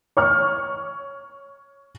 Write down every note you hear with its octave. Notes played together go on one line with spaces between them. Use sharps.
C#5 C#6 F6